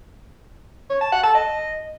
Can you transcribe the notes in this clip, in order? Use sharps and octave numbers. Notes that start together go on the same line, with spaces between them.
C#5
A5
F#5
A5
D#5